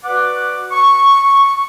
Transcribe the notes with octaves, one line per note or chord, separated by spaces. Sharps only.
F#4 B4 D5 F#5 D6
C#6